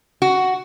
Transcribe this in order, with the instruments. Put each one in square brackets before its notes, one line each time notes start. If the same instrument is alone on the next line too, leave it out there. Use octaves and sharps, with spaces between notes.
[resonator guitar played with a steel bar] F#4